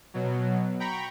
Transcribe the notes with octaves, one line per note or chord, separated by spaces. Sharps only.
B2 F#3
G5 A#5 B5 C#6